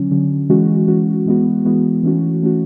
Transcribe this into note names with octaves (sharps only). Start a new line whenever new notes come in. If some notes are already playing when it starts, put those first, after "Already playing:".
Already playing: D3 F#3 C#4
D3 F#3 C#4
E3 G#3 C#4 F#4
E3 G#3 C#4 F#4
E3 G#3 B3 F#4
E3 G#3 B3 F#4
E3 A3 C#4 F#4
E3 A3 C#4 F#4